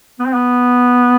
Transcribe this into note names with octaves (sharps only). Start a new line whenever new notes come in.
B3
C4
B3